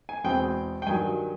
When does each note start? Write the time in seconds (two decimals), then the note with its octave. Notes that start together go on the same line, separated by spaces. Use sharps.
0.09 G#5
0.24 E2 B2 G#3 C4 G5
0.82 G5
0.87 G2 D#3 F#3 G#5